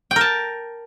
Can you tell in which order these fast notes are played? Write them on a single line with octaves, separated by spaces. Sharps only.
G5 A#4 A5